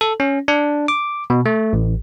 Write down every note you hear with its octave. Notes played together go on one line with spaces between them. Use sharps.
A4
C#4
D4
D6
B2
A3
A1